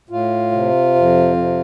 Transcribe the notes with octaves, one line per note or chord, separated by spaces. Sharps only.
A2 F4
C3
F2
C3